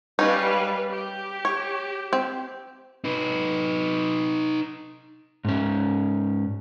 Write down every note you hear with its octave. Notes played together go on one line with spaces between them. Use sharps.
G3 C#4 D#4 B4 F5
G4
C#5
C4
D#4 B4
G#2 C#4